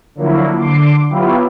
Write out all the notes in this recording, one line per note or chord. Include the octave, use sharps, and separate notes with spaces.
D3 F3 F#3 A#3 E4
D3 C6 D6
F#3 B3 E4 F4 G4